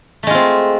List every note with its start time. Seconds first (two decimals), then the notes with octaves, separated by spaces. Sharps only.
0.23 A3
0.27 G#3
0.31 F4
0.34 C4